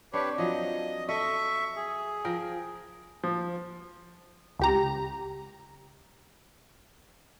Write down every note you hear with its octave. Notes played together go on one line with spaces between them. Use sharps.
C4 D4 G4 B4 C#5
F3 F#3 D#5
A4 D#5 E5 C#6
G#4
F3 A#4 G5
F3
C#2 G4 A#5